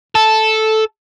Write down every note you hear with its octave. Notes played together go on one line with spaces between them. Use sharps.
A4